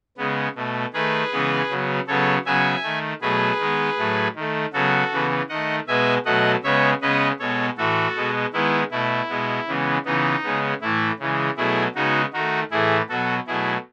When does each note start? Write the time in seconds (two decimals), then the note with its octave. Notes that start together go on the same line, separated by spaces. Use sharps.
0.17 C#3 G#3 B3
0.55 B2 A3
0.93 D#3 A3 G#4 B4
1.32 C#3 E3 G#3 B3
1.69 C#3 F#3 B3
2.07 C#3 F#3 B3 A4 C#5
2.45 C#3 F#3 B3 E5 G#5
2.83 D#3 A3
3.21 B2 F#3 A3 G#4 B4
3.60 D#3 G#3 B3
3.98 A2 F#3 A3
4.35 D#3 A3
4.73 C#3 F#3 B3 F#4 A4
5.12 C#3 E3 B3
5.49 D#3 A3 D#5 F#5
5.87 B2 G#3 B3 E5 G#5
6.25 B2 F#3 A3 D#5 F#5
6.63 C#3 G#3 B3 C#5 E5
7.01 C#3 G#3 B3 B4 D#5
7.39 B2 G#3 B3 A4 C#5
7.77 A2 E3 A3 F#4 A4
8.15 B2 G#3 B3
8.53 D#3 G#3 B3 E4
8.91 B2 A3 E4
9.29 B2 G#3 B3
9.68 C#3 E3 G#3 B3
10.05 C#3 E3 B3 D#4
10.43 C#3 G#3 B3
10.81 A2 E3 A3 E4
11.19 C#3 E3 G#3
11.57 B2 F#3 A3 E4 G#4
11.95 C#3 G#3 B3 D#4 F#4
12.33 D#3 A3 D#4 F#4
12.71 A2 E3 A3 E4 G#4
13.09 B2 F#3 B3 F#4 A4
13.47 B2 F#3 A3 E4 G#4